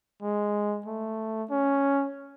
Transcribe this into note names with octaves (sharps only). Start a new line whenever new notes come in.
G#3
A3
C#4